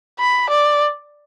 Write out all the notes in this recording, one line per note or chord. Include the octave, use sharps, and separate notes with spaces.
B5
D5